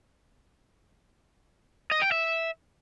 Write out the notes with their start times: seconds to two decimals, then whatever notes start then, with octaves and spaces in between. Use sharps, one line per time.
1.92 D#5
2.02 G5
2.12 E5